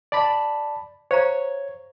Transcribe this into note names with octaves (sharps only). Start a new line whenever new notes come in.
D5 A5 B5
C5 C#5 F5 A#5